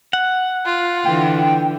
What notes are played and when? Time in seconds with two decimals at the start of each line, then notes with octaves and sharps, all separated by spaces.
0.13 F#5
0.65 F4
1.05 D3 E3 G5